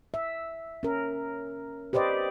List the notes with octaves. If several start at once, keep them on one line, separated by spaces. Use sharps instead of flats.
E5
C#4 A#4
G4 B4 C5 D5 D#5